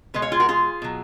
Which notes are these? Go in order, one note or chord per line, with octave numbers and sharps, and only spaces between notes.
B2 G#3 B4 D#5
C#5 F5
F4 G#4
F#4 A#4
F4 G#4
B2 F#3